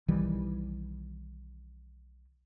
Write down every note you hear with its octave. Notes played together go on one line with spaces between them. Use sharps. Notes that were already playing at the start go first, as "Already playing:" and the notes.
B1 D#3 E3 G3